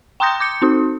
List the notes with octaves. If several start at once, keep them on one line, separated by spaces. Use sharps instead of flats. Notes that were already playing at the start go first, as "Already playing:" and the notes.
G5 A#5 C6 D#6 G6 A#6
D6 G6 C#7
C4 D#4 F#4